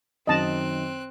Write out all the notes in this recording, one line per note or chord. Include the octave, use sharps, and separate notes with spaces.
F#2 D#3 C4 D#5 A5 F#6